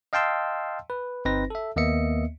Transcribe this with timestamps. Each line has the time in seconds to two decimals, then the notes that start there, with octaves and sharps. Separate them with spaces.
0.13 D#5 F5 G5 A5 C6 E6
0.90 B4
1.25 G1 C4 D#4 B4 C5 A#6
1.50 A4 E5
1.76 D#2 A#3 B3 D#5 E5 C#7